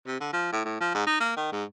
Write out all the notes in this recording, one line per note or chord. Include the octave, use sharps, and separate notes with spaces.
C3
D3
F3
A2
A2
F3
G#2
D#4
A#3
D#3
G#2